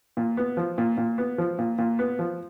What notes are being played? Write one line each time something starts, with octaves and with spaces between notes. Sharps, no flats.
A#2
B3
F3
A#2
A#2
B3
F3
A#2
A#2
B3
F3